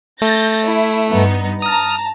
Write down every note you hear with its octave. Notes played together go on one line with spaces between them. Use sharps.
A3 G6 A6 A#6
E4
G2 B3 D#4
A5 A#5 D#6 F6